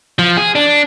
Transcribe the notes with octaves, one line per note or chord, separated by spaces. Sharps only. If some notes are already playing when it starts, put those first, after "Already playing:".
F3
G#4
D4